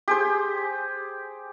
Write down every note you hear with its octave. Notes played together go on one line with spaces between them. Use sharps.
G4 G#4 C5